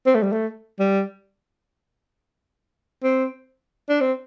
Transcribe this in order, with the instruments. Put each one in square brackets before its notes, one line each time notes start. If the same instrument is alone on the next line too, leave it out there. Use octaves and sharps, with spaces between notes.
[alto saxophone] C4
A3
G3
A3
G3
C4
D4
C4